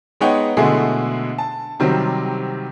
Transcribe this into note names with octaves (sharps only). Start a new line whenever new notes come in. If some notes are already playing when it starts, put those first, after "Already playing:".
G#3 B3 D#4 C#5 F#5 G5
B2 D3 G#3 A3 E4 G#4
A5
C3 D#3 F#3 G3 C4